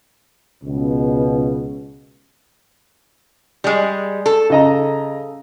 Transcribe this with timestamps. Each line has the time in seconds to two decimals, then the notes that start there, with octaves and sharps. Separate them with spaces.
0.64 C#2 B2
3.64 G3 G#3
4.26 A4
4.50 C#3 D#5 A#5